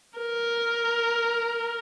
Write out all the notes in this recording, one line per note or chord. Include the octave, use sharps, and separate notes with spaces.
A#4